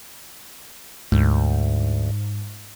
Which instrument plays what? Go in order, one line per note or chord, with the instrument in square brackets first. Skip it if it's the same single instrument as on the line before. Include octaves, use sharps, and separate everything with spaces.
[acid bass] D2 [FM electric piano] G#2